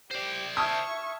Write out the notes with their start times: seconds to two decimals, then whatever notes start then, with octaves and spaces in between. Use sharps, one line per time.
0.11 G4 C5 D5
0.57 E5 A5 C#6 D#6 F6 G#6